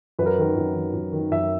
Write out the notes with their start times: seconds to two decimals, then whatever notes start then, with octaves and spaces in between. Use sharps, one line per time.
0.19 F#2 B4
0.26 A#4
0.38 D#3 A#4
0.56 F#2
0.75 D#3
0.93 F#2
1.13 D#3
1.31 F#2 E5